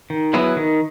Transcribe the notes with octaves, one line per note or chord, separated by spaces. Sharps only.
D#3
F#3 B3 E4 G#4
D#3